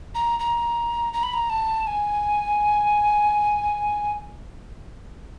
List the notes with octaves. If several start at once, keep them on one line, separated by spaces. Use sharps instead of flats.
A#5
A#5
A#5
B5
A#5
A5
G#5